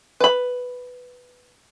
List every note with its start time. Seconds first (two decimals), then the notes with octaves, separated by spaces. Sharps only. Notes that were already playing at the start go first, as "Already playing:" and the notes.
0.20 B4 B5